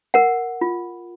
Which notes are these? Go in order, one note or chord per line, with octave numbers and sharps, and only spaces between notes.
A#4 F#5
F4